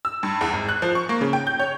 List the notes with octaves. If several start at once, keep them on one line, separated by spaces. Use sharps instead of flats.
E6
G2
E2
G#1
F#6
F3
C#6
A#3
C#3
G5
G6
C#5